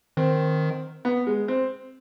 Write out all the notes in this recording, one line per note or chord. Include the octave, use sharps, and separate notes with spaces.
D#3 C4
B3
G#3
C4